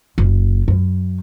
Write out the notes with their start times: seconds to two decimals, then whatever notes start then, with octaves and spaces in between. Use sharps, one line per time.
0.18 F#1
0.68 F#2